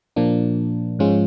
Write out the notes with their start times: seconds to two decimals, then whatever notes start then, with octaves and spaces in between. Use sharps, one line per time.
0.16 A#2 F3 A#3 D4
0.99 G#2 F3 G#3 C#4 F4